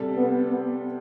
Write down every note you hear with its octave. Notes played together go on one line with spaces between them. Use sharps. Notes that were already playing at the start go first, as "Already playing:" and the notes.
Already playing: C3 G3 D4 A4
B3
B3